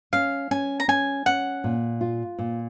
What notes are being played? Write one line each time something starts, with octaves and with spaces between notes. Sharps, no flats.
C#4 F5
C#4 G#5
A#5
C#4 G#5
C#4 F#5
A#2
F4
A#2